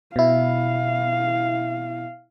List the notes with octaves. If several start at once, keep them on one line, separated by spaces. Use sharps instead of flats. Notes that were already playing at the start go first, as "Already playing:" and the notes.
B2 E4 F5